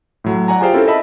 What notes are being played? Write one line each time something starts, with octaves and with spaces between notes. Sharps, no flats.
A2 F#3
D5 F#5 G#5 A#5
F4 G4 G#4 C5 F5 G5
C4 C#4 E4 A4 A#4
D#5 E5 A5 B5